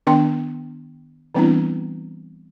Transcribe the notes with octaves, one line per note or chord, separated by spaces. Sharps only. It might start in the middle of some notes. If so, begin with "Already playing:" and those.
D#3 B3 D4 G5 C6
E3 G3 B3 C4 D4 E4